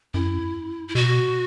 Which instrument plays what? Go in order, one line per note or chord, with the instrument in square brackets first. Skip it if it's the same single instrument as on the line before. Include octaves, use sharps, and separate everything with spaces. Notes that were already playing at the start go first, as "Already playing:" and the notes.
[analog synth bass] F#2 [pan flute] E4
[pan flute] E4
[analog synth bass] B2 [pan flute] F#4